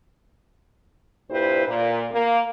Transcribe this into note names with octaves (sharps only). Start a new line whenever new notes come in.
G2 A#2 G3 E4 B4 C5
A#2
A#3